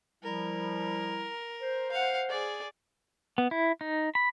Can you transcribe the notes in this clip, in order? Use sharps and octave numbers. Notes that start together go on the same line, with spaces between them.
F3 G3 E4 A#4
C5
F5 F#5
G#4 D5
B3
E4
D#4
B5